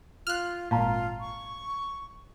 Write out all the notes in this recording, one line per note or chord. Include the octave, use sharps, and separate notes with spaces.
F4 F6 F#6
G#1 A#2 F4 F5 A5 A#5
C#6